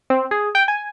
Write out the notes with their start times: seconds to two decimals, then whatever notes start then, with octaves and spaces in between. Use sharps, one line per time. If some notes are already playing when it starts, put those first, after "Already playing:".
0.10 C4
0.31 G#4
0.55 G5
0.68 G#5